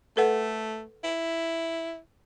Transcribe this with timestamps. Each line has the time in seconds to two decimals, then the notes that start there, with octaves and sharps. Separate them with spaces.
0.17 A3 A4 B4 F#5
1.04 E4